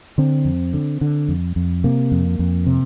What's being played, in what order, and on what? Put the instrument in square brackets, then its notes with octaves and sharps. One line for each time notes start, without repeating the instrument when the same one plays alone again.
[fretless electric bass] D3 C4
F2
D3
D3
F2
F2
C3 A#3
F2
F2
C3